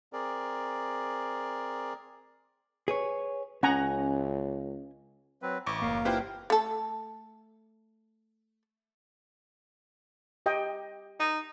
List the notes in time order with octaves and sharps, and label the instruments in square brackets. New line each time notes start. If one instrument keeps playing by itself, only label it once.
[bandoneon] C4 G#4 A#4 D5
[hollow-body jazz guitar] G#4 B4 C#5
[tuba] C#2 [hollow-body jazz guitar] C#4 G#5 [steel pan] F#5 A#5
[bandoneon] F#3 C4 B4
[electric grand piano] A1 C#6 D6 [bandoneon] E4
[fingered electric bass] F#1 A#3 [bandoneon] A#4 F5
[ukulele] E4 F4 G5 [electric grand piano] G4 B4 C5
[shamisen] A3 A4
[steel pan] G4 D#5 G5
[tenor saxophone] D#4